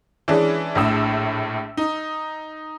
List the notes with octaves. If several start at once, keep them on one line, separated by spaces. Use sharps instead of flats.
E3 G#3 C#4 D4 G#4
A#1 A2 E6
D#4